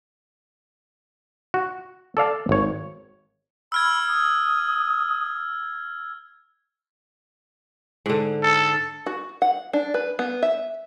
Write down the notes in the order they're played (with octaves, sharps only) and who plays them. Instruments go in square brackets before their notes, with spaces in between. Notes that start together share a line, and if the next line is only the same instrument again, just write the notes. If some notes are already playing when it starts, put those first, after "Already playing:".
[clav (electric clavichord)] F#4
A4 D5 F5 A5
G#1 C#5
[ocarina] B5 [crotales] E6 F6 G#6
[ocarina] D#6
[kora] G#2 D3
[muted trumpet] A4
[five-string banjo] F#4
F#5
D4
B4
B3
E5